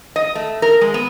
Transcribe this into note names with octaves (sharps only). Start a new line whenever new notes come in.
D#5
A3
A#4
G#3
B3